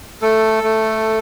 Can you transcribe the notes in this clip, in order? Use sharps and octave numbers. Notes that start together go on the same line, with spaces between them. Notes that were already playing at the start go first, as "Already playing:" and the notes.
A3 A4
A3